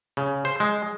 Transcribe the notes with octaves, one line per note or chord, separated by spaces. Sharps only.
C#3
C5
G#3